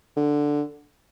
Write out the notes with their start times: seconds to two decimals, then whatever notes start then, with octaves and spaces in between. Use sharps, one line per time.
0.17 D3